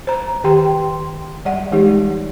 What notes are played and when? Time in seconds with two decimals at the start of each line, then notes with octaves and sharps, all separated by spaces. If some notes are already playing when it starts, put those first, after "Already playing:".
0.07 C5 A#5
0.44 D#3 G4 G5 C6
1.45 G3 D5 F#5
1.72 E3 G#3 D#4 G4